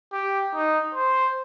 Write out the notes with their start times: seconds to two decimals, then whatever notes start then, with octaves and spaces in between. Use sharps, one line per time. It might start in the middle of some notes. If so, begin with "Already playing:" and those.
0.12 G4
0.54 D#4
0.94 C5